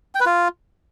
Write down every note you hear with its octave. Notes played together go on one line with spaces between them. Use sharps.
G5
B4
F4